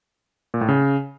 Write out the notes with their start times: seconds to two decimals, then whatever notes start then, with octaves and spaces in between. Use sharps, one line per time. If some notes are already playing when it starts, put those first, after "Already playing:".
0.54 A#2
0.61 A2
0.69 C#3